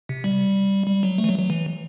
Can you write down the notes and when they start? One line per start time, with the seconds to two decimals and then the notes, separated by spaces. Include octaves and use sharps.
0.09 C3
0.24 G3
0.87 G3
1.03 F#3
1.18 A3
1.24 E3
1.29 F#3
1.39 F#3
1.50 E3